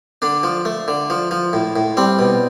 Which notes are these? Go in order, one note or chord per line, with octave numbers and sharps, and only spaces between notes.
D3 D4
F3
A3
D3
F3
F3
A2
A2
G3 C4
B2